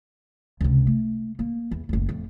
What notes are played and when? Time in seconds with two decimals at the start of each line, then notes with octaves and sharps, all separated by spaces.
0.61 C#2 C3
0.87 A3
1.39 A#3
1.71 E2
1.89 F#1 D2
2.09 F2 A2